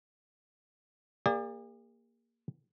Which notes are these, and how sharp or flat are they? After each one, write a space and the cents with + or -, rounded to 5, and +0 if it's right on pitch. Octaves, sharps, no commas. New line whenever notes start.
A#3 +0 G#4 -45 D5 +0